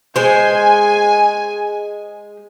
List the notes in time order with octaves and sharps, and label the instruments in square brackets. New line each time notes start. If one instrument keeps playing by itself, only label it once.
[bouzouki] G#3 C5 [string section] G#5